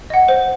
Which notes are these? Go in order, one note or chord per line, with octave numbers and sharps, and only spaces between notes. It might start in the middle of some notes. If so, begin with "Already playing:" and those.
D#5 F#5
C5